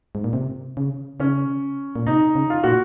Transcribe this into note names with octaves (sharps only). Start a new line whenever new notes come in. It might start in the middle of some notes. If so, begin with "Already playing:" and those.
G#2
A#2
C3
C#3
C#3 C#4
A#2
C3 D#4
C#3
F4
A#2 F#4